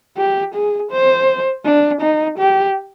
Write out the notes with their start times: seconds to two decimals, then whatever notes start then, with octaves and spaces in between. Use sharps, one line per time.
0.17 G4
0.54 G#4
0.91 C5
1.65 D4
2.01 D#4
2.38 G4